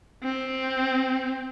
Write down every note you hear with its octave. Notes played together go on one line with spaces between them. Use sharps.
C4